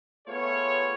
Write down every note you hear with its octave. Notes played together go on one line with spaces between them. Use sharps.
A3 B3 F4 G#4 C#5